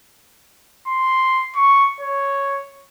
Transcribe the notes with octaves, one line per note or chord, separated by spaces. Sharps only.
C6
C#6
C#5